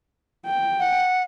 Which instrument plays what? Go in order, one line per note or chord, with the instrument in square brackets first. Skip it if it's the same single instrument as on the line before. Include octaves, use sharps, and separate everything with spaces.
[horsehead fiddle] G5
[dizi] F#5